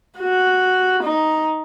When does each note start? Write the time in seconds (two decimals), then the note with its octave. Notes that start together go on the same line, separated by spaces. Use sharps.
0.19 F#4
1.03 D#4